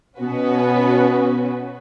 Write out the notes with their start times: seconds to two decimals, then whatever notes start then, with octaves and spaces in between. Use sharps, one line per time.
0.19 B2 B3 C#4 F#4 B4